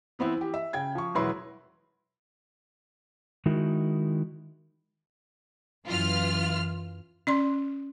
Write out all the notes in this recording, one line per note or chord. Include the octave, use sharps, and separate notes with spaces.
E3 B3 C4 E4
E3 G4
E5
C#3 G5 G#6
F3 C#6
E1 F#3 E4 B4 C6
D#3 G#3 D#4 E4 F#4 A#4
F#2 E3 F4 F6
C#4 D5 C6